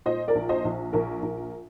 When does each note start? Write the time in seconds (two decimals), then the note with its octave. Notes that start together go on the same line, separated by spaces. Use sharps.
0.06 A#2 C5 D#5
0.28 A#4 D5
0.35 A#1
0.49 C5 D#5
0.65 A#1
0.93 A#1 A#4
1.22 A#1